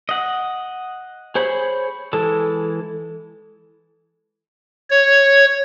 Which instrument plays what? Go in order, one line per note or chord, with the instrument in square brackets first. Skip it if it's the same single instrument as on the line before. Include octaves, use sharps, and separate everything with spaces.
[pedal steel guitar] D#5 F#5
G#4 C5 C#5 B5
E3 G#3 A4
[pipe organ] C#5